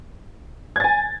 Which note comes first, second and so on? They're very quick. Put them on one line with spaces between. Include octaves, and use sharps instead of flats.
G#6 A6 G#5